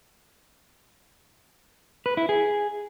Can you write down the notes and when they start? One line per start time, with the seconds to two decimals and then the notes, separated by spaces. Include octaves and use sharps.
2.06 B4
2.17 E4
2.29 G#4